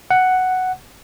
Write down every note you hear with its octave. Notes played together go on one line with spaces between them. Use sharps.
F#5